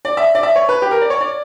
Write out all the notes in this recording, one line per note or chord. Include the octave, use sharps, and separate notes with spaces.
D5
E5
D5
E5
C#5
B4
G4
A#4
D5
C#5
D5